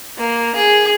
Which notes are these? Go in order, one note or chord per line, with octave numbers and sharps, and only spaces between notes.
A#3
G#4